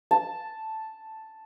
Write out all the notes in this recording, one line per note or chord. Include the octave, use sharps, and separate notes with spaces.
A5